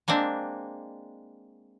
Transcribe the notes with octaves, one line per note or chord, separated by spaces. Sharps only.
G#3 A#3 C4 D4